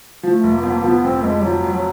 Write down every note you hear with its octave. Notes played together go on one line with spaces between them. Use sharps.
F3 A3
F1
A#3
F2 B3
A#3
F3 B3
F1 C4
F1 G#3
F3 F#3
F2
F#3